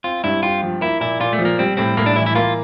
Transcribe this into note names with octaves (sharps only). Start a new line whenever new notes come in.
C4 F4
G2 E4
F4 G4
F3
A#3 E4
A#2 E4
A#2 F4
A3
F3
A#3
G3 C4
A2 C4
A2 A#3
D4
E3 E4
E4
A#3 F4